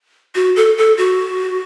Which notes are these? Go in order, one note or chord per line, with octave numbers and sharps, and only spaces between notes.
F#4
A4
A4
F#4